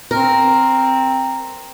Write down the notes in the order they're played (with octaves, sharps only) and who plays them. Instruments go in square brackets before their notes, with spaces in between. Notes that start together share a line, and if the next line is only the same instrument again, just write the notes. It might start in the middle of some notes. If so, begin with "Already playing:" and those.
[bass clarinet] C4 [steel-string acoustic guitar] A#4